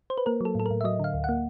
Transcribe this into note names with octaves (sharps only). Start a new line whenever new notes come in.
C5
B4
A#3 A#4
F#3 A4
A2 A4
A2 A#4
E5
F#3 D#5
D3 F5
D2
A#3 F#5